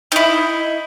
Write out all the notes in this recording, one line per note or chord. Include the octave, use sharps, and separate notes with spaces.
D#4 E4